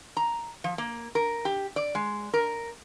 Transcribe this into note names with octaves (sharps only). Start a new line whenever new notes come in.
A#5
F3
A#3
A#4
G4
D5
G#3
A#4